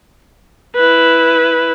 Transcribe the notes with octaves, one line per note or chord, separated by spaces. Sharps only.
E4 B4